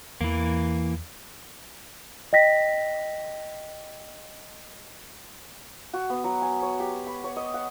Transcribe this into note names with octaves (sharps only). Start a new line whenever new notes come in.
E2 E3 A#3
D#5 G5 A#6 B6
F#4
B3
F#3
G#5
C#5
G4
B5
C#5
D#5
F#5